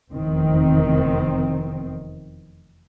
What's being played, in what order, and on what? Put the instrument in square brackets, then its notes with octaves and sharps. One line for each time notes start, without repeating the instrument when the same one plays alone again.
[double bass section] F1 E2 D#3 C4